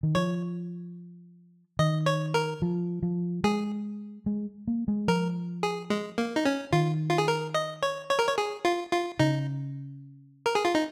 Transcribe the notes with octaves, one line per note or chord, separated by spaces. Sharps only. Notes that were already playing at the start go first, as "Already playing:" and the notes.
D#3
F3 C#5
D#3 D#5
C#5
A#4
F3
F3
G#3 G#4
G#3
A#3
G#3
F3 A#4
G#4
G#3
A#3
D#4
C#4
D#3 F4
F4
G#4
A#4
D#5
C#5
C#5
A#4
C#5
G#4
F4
F4
C#3 D#4
A#4
G#4
F4
D#4